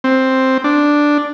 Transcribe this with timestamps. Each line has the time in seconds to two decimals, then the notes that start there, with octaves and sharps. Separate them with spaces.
0.04 C4
0.64 D4